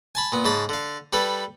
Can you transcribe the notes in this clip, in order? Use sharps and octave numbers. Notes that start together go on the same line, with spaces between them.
G#5 A5 B5
A#2 B3
G#2 C#3 A5 B5 D#6
D3 F5
G3 A4 B4